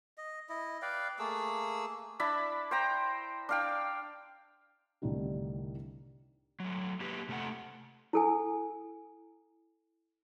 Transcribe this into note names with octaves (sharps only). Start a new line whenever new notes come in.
D#5
E4 D#5
B4 D5 F5 G5
A3 A#3 G#4 E6
D4 E4 A5 B5
C5 G5 A#5
D4 F5 G5
C2 A2 D3 D#3 G3
F#3 A3
A#3 F#4 G4 B4
C3 A3 A4 F#5
E4 A4 G#5